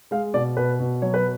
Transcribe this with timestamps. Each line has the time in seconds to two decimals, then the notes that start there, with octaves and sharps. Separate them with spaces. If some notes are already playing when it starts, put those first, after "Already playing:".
0.11 G#3 F5
0.34 B2 D5
0.57 B2 B4
0.80 B2
1.02 F#3 C#5
1.14 B4